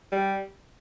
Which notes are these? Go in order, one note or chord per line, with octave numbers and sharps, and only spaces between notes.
G3